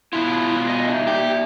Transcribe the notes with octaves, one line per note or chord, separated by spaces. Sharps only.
B2 E4 F4
D#5
D#4 D5 E5
G4